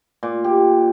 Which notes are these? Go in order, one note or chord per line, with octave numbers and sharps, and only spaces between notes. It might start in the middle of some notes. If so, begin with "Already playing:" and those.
A#2
G4